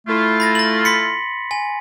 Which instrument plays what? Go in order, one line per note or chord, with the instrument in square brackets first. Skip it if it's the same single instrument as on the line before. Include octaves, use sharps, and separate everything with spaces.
[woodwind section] A3 E4 F4
[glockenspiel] B5 A6 A#6
A#6 F#7
C6 B6 C#7
G#5